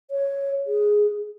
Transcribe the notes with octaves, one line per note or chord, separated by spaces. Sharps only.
C#5
G#4